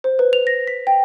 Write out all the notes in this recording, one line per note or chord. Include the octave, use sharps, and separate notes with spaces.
C5
B4
F7
A#6
B6
G5